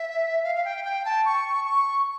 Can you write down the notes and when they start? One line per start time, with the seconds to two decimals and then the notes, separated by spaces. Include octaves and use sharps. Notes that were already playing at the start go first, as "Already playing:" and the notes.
Already playing: E5
0.44 F5
0.55 F5
0.65 G5
0.85 G5
1.05 A5
1.25 C#6
1.65 C#6